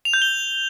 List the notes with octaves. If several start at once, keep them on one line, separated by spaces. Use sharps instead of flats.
F7
G6
G7